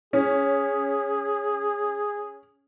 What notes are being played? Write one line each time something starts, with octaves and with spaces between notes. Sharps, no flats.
C#4 G#4